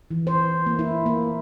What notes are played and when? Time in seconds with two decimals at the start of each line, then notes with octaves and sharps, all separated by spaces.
0.11 E3
0.27 C5
0.66 A#3
0.79 E4
1.06 A#3